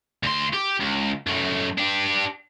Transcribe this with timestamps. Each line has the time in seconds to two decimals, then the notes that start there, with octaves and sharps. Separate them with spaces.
0.23 D2 C6
0.53 G4
0.80 C#2
1.27 F#2 A3
1.78 D4 G4